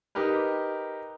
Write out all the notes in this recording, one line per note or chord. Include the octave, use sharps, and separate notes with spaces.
D#4 G4 A#4 B4